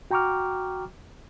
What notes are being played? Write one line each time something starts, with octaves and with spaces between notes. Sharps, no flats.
F#4 G5 A#5 C#6 D6 F6